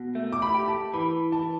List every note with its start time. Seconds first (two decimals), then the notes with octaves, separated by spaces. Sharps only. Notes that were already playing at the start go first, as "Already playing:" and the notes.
Already playing: B2
0.15 A3
0.33 D6
0.42 B5
0.54 G4
0.68 A5
0.94 E3 B5
1.32 E3 A5